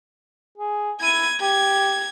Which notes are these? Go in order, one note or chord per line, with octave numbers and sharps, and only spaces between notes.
G#4
E4 G#6 D#7
G4 G#6